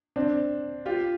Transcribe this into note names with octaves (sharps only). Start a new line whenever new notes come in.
C4 D4
F4 G4